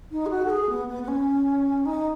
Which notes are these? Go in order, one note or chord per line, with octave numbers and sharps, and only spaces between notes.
D#4
G#4
F#4
A4
G#4
B3
B3
B3
C#4
D#4